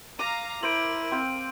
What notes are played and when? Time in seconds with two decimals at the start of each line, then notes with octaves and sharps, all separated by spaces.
0.19 F5 A#5 D6 D#7
0.63 E4 A#4 C5 D7 D#7 F#7
1.11 C4 F5 G5